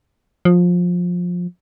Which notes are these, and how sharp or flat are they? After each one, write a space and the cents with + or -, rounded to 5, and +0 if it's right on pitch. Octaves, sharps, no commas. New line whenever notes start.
F3 +20